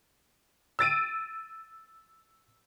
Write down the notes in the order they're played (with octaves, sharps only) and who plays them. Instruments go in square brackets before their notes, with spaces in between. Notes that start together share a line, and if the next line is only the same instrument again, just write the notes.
[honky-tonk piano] E6 A6 D7 D#7